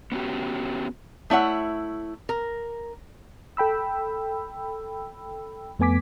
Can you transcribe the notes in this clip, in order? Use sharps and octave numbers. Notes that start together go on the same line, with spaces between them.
B3 C#4 F#4 G4
A3 E4 C#5 F#5
A#4
A4 G5 B5 E6
F2 A3 B3 G#5 D6 B6